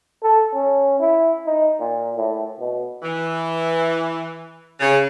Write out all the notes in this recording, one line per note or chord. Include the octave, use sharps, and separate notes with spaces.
A4
C#4
E4
D#4
A#2
A2
B2
E3
C#3